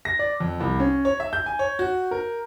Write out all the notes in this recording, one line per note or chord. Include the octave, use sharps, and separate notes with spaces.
A#6
D5
F2
C2
C#4
C#5
E5
G6
G#5
C#5
F#4
A#4